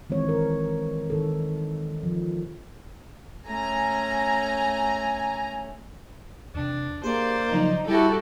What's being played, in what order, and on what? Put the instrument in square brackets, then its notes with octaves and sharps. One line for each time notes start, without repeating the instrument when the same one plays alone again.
[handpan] D#3 E3 G#3 C4 C#5
A#4
D#3 A4
F3
[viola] A3 C#4 [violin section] G#5 A#5
[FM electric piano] E2 C3 [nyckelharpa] D4
[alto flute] A#3 [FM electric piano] G4 G#4 C6 [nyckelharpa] C5 D5
[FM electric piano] C#3 F3 F#3 [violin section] D#4
[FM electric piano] G3 A#6 [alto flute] E4 [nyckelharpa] F#4 G4 [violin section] A4